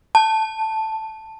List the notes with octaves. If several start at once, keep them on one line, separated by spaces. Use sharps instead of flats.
A5